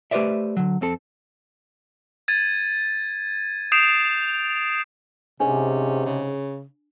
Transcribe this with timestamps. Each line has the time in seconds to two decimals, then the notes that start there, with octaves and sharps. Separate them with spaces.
0.11 A3 G4 B4 C5 D5 E5
0.57 D3 F#3
0.81 F2 C4 A4
2.28 G#6 A6 D#7
3.72 D#6 G6 C7 D7 E7 F7
5.40 G#2 C3 C#4 D4
6.06 C#3